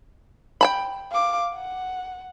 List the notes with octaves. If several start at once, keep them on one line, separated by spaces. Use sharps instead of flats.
G5 A5 B5
F5 D6
F#5